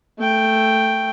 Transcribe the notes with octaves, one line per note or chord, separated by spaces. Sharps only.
A3 G5